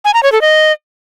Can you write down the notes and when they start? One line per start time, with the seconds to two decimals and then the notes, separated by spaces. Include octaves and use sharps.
0.05 G#5
0.14 A#5
0.23 C#5
0.32 A4
0.41 D#5